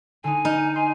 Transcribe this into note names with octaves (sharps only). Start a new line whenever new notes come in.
D3 D#4 G#5
D#4 F6
G#5 C6